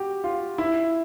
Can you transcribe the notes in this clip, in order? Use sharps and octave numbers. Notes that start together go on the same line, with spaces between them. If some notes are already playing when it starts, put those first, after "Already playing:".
Already playing: F#4 G4
F4
E4